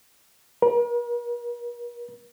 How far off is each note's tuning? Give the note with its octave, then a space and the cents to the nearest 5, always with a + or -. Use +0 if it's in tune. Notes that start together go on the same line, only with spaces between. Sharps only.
A#4 +45